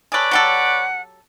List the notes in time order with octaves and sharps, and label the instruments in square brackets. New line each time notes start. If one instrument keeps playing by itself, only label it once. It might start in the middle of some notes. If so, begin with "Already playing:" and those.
[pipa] G#4 A4 [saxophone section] B4 C#5 D5
[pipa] F#3 G4 A4 [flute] F#5